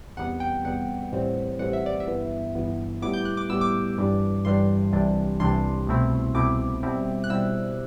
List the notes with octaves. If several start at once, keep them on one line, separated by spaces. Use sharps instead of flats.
E2 C3 G3 B3 F#5
G5
E2 C3 G3 B3 F#5
A1 A2 E3 G3 C4
A1 A2 E3 G3 C4 F#5
E5
D5
E5
G1 G2 E3 B3
G1 G2 E3 B3
A2 G3 B3 E4 D6
G6
F#6
D6
A2 G3 B3 E4 E6
D6
G1 G2 E3 G3 D4
G1 G2 E3 G3 D4 C6
C2 C3 E3 G3 D4
C2 C3 E3 G3 D4 C6
C2 B2 A3 C4 E4
C2 B2 A3 C4 E4 D6
B2 G3 C4 E4
F#6
B2 G3 C4 E4 E6